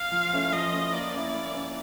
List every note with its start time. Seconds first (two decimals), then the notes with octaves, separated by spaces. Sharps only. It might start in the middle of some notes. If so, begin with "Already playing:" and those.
Already playing: F5
0.12 F3
0.32 A3 C#4 E4
0.52 F3 D#5
0.73 A3 C#4 E4
0.93 A#3 D5
1.14 C#4 E4
1.34 A#3
1.54 C#4 E4